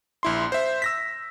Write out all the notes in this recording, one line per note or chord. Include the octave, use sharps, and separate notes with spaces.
A#1 E4 C6
C5 E5
E6 A#6 B6